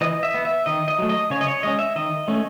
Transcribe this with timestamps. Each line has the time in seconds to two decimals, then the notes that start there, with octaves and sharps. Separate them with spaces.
0.01 E3 D#5
0.23 E5
0.34 B3
0.45 E5
0.66 D#3 D#5
0.88 D#5
0.99 F#3 A3
1.09 D#5
1.30 C#3 C#5
1.41 D#5
1.47 C#5
1.63 G#3 C#4 D#5
1.79 E5
1.96 D#3 D#5
2.28 A3 C#4